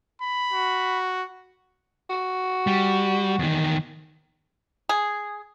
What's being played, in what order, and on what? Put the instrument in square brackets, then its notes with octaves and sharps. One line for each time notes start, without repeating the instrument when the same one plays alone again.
[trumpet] B5
[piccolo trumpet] F#4
[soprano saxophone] F#4
[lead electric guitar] G3
E2 D#3
[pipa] G#4